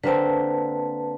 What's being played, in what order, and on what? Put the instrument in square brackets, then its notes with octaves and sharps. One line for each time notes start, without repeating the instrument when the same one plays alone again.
[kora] D3 A#3 C4 [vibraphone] B4 A5